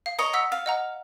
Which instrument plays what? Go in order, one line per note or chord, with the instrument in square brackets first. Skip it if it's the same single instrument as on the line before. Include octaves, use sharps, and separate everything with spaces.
[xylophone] F5
[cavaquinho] C#5 D#5 A#5
[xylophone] F#5 E6 B6
[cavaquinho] F5
[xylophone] D#5 F#5 A#5